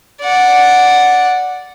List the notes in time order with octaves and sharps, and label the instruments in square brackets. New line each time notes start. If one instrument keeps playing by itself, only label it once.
[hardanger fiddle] D5 F#5